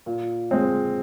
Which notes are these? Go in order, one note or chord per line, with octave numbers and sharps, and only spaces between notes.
A#2
G#3 C4